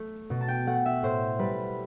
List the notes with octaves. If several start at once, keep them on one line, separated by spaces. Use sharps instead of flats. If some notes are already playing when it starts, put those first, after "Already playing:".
Already playing: A3
B2
A5
G5
A3 F#5
E5
A2 C5
G3 B4